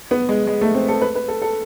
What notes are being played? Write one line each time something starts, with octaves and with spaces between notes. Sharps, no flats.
B3
G#3
G#3
A3
C4
A4
B4
B4
A4
A4